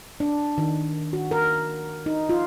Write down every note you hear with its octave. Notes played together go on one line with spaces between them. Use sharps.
D4
D#3
F#4
A#4
D#4
F4